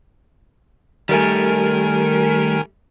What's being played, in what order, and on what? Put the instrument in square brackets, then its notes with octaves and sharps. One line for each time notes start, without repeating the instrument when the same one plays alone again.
[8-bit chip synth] D#3 A#4 G#5 [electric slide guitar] G3 A3